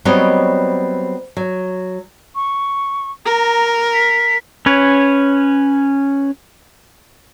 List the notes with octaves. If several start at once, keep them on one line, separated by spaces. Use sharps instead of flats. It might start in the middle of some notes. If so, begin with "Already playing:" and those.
F#3 G3 B3 C4 C#5 D#5
F#3
C#6
A#4 A#5
B6
C#4 B4 C#5